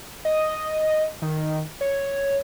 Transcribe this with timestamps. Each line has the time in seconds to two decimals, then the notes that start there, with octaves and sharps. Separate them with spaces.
0.25 D#5
1.22 D#3
1.81 C#5